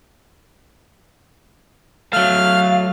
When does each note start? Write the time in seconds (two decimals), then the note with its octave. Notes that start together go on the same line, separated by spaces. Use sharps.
2.13 F#3 A3 F5 F6